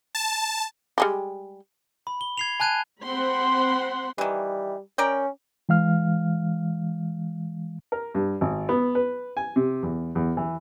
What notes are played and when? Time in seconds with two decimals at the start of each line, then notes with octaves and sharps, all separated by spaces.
0.15 A5
0.98 G3 G#3 G4
2.07 B5
2.21 G7
2.38 G#6 C7 F7
2.60 G#5 A5 F#6 G#6 D#7
3.02 C4 C5 F#5 B5 C6
4.18 D#3 E3 G3
4.98 C#4 A#4 D5 G5
5.69 E3 G#3 F5 F6
7.92 A#4
8.15 G2
8.41 G#1
8.69 B3
8.95 B4
9.37 G#5
9.56 C3
9.83 E2
10.15 E2
10.37 E3